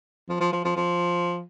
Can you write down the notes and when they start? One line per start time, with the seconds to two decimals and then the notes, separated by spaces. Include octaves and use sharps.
0.29 F3
0.41 F3
0.53 F3
0.65 F3
0.76 F3